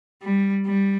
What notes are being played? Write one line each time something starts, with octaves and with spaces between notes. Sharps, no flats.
G3
G3